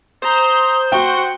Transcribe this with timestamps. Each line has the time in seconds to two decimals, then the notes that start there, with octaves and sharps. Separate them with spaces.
0.22 C5 A#5 D#6 G6
0.92 F#4 F#5 G5 C#6